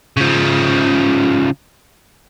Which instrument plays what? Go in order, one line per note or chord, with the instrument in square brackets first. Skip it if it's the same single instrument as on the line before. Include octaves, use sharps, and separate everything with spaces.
[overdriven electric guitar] C#3 F3